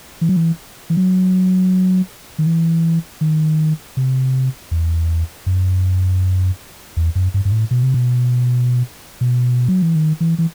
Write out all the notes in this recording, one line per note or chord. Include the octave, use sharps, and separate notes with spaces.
E3
F#3
E3
E3
F#3
D#3
E3
D#3
C3
E2
F#2
E2
F#2
G2
G2
A2
B2
C3
B2
B2
F#3
E3
D#3
E3
E3